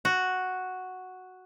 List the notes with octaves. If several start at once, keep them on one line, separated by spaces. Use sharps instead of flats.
F#4